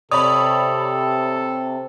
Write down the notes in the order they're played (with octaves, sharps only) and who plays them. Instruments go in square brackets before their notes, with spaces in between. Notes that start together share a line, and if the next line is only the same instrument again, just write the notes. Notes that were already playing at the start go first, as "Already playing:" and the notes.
[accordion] C3 [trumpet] A4 [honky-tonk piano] C#5 D5 B5 [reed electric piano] D#6